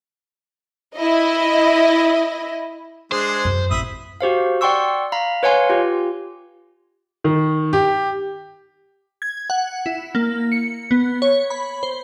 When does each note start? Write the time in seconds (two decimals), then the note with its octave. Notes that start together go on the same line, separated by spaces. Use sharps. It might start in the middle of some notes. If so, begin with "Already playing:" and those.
0.96 E4 D#5
3.12 G#3 D4 G#4 C5
3.45 F#2
3.70 A1 C4 E5 B5 D#6
4.21 F#4 G4 C5 F5
4.61 D5 F#5 G5 C6 C#6 E6
5.12 F5 A#5 B5
5.43 B4 C#5 F5 F#5 G#5 C6
5.70 F4 G4
7.24 D#3
7.73 G4
9.22 G#6
9.50 F#5
9.86 E4
10.15 A#3
10.52 C#7
10.91 B3
11.22 C#5
11.50 B5
11.83 C5